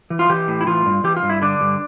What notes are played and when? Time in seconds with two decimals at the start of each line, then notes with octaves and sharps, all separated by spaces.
0.10 E3
0.19 F4
0.30 E3 G4
0.48 A2
0.61 E4
0.67 E3 F4
0.86 G2
1.04 E3 G4
1.17 F4
1.23 G2
1.29 E4
1.42 D3 D4
1.61 G2